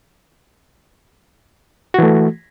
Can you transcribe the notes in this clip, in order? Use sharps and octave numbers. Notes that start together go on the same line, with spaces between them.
E3 A3 F#4